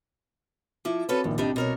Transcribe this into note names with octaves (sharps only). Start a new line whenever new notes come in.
F3 E4 D6
C4 C#4 F#4 A4 B4
A#1 E2 D#3
C2 G3 D4 D#4
B2 A#4 C#5